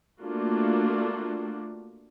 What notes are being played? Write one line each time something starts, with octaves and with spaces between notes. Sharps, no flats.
A3 A#3 D4 F4 F#4